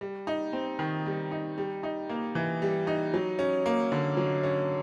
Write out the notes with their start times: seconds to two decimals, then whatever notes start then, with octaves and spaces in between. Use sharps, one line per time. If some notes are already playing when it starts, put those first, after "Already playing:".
0.01 G3
0.27 D#4
0.53 C4
0.79 D#3
1.06 G3
1.31 D#4
1.58 G3
1.83 D#4
2.09 A#3
2.35 E3
2.62 G3
2.87 D#4
3.14 F#3
3.39 C#4
3.66 A#3
3.92 D3
4.17 F#3
4.43 C#4